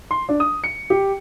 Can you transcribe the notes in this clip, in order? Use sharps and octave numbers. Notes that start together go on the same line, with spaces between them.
C6
D4
D#6
C#7
G4